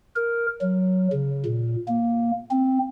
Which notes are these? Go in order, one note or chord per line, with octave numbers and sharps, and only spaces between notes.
A#4
F#3
C#3
A#2
A#3
C4